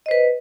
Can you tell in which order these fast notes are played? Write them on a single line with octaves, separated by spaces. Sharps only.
D#5 C5 B4